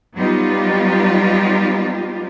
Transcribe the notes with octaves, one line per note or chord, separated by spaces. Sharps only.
F#3 G3 B3 D#4 F4 G4